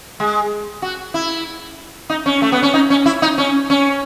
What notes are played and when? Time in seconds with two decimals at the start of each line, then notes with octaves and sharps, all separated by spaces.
0.20 G#3
0.82 F#4
1.14 E4
2.10 D#4
2.26 C#4
2.42 A3
2.52 B3
2.63 C#4
2.74 D#4
2.90 C#4
3.06 E4
3.22 D#4
3.38 C#4
3.70 C#4